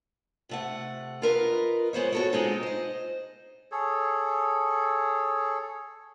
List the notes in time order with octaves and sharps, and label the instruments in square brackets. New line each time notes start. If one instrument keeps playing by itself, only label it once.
[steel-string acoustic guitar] C3 A3 F#5
F4 A#4 B4 D#5
G#3 B3 C5 C#5
F#4 A4 C#5
G#3 B3 C4 D4 D#4 F4
C5 D#5
[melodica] G#4 A4 C#5